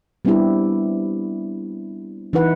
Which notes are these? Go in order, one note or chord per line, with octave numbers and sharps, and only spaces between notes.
G3 B3 C4 D4 E4 G4
E3 D#4 E4 B4 F#5